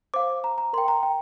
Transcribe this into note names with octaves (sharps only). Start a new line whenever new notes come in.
C5 F5 D6
A#5
A#5
A#4 G5 C6
A#5
G5